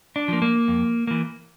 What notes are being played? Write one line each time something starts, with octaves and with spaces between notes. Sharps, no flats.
D4
F3 A#3
A#3
F2
E3 A#3